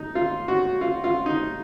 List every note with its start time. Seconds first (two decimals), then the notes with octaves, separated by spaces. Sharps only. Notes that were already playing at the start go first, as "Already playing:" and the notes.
Already playing: D#4
0.15 F4
0.48 F#4
0.81 F4
1.04 F4
1.26 D#4